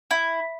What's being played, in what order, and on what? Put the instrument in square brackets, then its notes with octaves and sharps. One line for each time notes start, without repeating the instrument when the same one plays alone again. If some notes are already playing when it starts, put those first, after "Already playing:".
[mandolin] E4